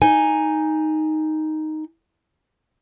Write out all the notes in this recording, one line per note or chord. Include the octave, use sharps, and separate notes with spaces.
D#4 G#5